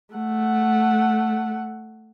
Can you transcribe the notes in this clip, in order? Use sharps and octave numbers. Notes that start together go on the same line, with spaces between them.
A3 F#5